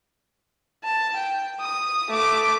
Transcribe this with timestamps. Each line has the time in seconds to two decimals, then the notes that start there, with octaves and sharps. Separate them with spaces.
0.84 A5
1.16 G5
1.60 D#6
2.09 A3 D6